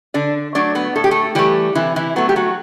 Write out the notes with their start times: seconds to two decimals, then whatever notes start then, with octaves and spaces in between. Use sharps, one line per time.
0.14 D3 D4 D5
0.55 F#3 A3 D4 D5
0.75 B3 B4
0.96 A2 A4
1.04 G4
1.11 A3 A4
1.35 E3 G3 A3 G4
1.75 C3 E3 E4
1.96 E3 E4
2.16 F#3 A3 B3
2.29 G4
2.36 F#3 F#4